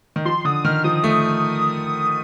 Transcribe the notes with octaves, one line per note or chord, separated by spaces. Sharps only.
D#3
F3 C6
D3 D#6
D#3 F6
F3 D#6
A3